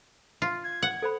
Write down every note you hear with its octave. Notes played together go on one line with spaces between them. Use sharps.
F4
G#6
F#5
A4 C5 B5